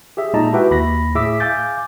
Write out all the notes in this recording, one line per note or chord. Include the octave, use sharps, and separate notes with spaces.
G4 G#4 E5
A#2 G#3 D#4 D#5 A5 A#5
E4 F#4 G4 B4 E5 G5
D#2 B5 A#6
A2 G#4 E5 D6 E6 B6
F5 G#5 D6 G6 A6